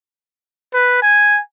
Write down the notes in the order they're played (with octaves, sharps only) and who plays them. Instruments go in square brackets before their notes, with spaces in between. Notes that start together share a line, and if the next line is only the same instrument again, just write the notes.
[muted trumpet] B4
G#5